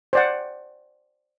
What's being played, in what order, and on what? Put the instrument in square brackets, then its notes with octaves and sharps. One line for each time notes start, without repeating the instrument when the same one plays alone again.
[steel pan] C5 D5 F#5